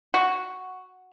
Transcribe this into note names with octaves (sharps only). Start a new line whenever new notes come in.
F#4